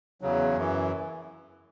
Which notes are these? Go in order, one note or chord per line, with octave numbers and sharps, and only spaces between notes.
E2 C#3 F#3
F#2 E3